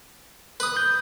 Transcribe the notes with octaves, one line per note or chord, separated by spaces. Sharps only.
B4 D#6
G6